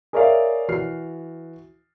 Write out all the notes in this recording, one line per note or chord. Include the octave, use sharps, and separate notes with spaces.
G#4 A#4 C#5 D5 E5 F5
E3 F#4 F6 C7